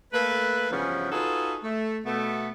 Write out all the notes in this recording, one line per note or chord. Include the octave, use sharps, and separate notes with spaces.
A3 A#3 A4 B4
G2 C#3 E3 F3 B3 C#4
D#4 F4 F#4 G#4 A4 B4
A3
B2 A3 B3